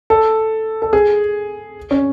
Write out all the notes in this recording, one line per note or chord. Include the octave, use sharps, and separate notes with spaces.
A4
A4
G#4
C#4